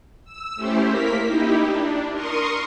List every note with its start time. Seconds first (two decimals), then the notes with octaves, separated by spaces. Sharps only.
0.25 E6
0.56 A3 C#4 E4 G4 C5
0.85 A#3 A#4 B6
1.24 D#4 E4 G4
1.65 D4
2.12 A#4 C6 C#6 D#6